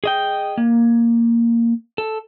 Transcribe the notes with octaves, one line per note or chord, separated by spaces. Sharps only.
G#4 D#5 G5
A#3
A4